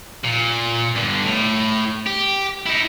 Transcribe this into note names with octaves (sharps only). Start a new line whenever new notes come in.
A#2
G2 D3
A2
G4
D#4 E4